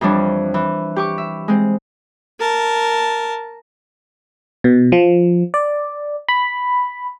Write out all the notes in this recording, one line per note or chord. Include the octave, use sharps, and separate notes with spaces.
F2 E3 G3 D4 C#5
E3
G4 C#6 D6
E5
G#3 C4
A#4 A5
B2
F3
D5
B5